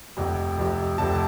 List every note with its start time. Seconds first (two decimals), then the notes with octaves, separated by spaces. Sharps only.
0.17 F1 F2 C3
0.57 F1 F2 C3
0.98 F1 F2 C3 A5